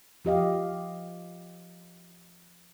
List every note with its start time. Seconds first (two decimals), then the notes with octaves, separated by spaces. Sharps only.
0.25 F3 G4 D#5 F5